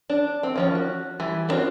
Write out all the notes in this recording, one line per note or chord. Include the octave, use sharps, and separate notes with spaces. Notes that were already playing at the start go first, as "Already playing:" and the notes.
D4
C4
D#3 F3 C#4
F#4
E3 G3 G#5
B3 C4 D4 F4 F#4